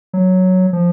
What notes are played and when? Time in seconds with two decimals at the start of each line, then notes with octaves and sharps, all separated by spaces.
0.13 F#3
0.73 F3